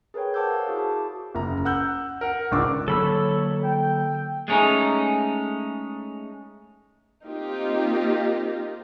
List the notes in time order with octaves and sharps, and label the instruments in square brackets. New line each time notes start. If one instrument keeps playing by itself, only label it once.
[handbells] G#4 A#4 B4 C#5 G5
C5 F#5 A5 D6 E6 G6
F5
E4 F#4 G#4
A5
D6
[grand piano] F#1 A#5
F#5 E6 F#6 G6
A#4 F#5
G#1 C#2 D4 C#6 D6 E6
[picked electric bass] D3 F#3 A#3 [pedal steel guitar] A4 B5 E6 [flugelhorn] C#5
[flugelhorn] G5
[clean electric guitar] G#3 A3 C#4 D#4
[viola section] A#3 C4 D#4 F4 G4